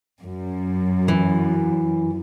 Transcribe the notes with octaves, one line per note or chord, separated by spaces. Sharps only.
F#2
E3